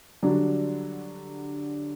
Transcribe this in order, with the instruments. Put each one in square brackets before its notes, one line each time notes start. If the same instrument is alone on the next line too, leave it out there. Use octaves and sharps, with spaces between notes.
[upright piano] D3 F#3 G3 D4